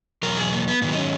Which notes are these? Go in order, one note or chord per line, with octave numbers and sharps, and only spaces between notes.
E2 B2 F#3 A#4
G#4
A#3
B3
G#2 D#3 F#3 B3
D#4
C#4